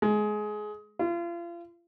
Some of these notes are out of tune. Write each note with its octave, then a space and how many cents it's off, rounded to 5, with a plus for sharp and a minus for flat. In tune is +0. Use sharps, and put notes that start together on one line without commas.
G#3 +20
F4 -35